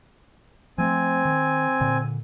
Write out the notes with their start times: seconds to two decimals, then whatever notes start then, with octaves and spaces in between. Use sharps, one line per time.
0.78 F3 A3 C4 G#5
1.25 D#3
1.81 A#2 D3